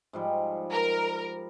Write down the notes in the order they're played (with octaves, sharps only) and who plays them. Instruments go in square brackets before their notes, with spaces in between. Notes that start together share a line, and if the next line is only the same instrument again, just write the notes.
[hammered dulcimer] G#2 F3 G3
[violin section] A#4